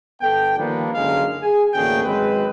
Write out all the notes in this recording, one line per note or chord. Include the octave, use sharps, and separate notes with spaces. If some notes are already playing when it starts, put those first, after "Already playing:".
G1 B3 A4 G5
D#3 F3 G3 A#3 B3 D4
F#1 C#2 D3 G#3 A#4 F5
G#4 G#5
A1 D2 A#3 C#4 G#4 G5
G#1 F#2 G#3 C4 B4